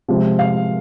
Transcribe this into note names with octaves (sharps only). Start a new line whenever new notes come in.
C3 F3 G#3
F5